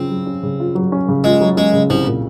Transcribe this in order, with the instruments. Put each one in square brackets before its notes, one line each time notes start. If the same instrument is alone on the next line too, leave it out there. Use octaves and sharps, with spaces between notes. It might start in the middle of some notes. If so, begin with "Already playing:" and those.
Already playing: [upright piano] C#3 F#3 C#4 F4 [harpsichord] C4
[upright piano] F#3
C#4
C#3
F4
F#3
C#4
C#3
[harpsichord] G#3 [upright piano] F4
[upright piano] F#3
[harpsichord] G#3 [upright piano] C#4
[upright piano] C#3
[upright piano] C2 [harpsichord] F3
[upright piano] A#2